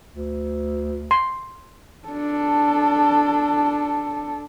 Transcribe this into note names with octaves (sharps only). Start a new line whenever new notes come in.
D2
C6
D4 A4